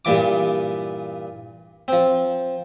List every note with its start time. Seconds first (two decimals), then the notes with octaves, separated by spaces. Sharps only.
0.05 G2 A#2 E3 D6
1.88 F3 C4